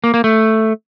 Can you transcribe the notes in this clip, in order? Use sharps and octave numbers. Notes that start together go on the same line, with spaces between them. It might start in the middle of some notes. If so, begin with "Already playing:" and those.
A#3
A#3
A3